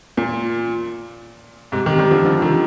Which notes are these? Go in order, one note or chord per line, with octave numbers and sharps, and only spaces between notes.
A#2
G#2 C3
C3 D#3
D#3 G3
D3 F3
D3 F3
C3 D#3